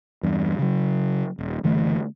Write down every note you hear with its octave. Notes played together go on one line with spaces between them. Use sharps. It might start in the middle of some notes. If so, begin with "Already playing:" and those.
E2 G2
C#3 F#3
D#1
F#1 D3 E3 A3